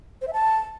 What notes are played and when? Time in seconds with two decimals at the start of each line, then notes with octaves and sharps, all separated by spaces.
0.22 C5
0.27 E5
0.33 A5